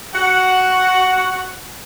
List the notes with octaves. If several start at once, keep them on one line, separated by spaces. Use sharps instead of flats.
F#4 F#5